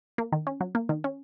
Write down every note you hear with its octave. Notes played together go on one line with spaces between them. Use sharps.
A#3
D#3
C#4
F#3
A#3
D#3
C#4